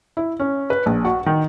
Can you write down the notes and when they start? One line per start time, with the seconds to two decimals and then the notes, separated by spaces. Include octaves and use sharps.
0.17 E4
0.40 C#4
0.70 B4
0.86 A#1
1.05 F#4
1.26 D#3